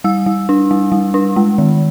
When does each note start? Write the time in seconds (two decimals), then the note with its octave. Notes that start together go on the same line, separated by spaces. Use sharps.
0.04 G3 E6
0.26 G3
0.49 D4
0.71 G3
0.92 G3
1.14 D4
1.36 G#3
1.58 D#3